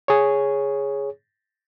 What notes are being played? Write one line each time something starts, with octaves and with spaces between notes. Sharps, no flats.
G#4 C#5